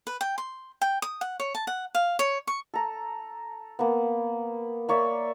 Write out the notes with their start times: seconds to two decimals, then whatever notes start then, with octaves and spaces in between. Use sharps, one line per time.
0.07 B4
0.21 G5
0.38 C6
0.81 G5
1.02 D#6
1.21 F#5
1.40 C#5
1.55 A5
1.67 F#5
1.95 F5
2.19 C#5
2.47 C#6
2.74 A4 A#5
3.79 A#3 B3
4.89 A#3 C#5 D5 E5